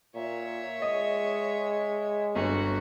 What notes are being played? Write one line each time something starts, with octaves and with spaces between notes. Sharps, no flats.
A#2 C#5 E5
G#3 D#5
G1 F#4